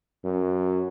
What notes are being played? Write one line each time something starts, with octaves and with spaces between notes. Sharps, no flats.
F#2